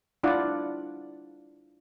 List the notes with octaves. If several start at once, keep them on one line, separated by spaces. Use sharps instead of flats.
D4 E4 F4 D5 F#5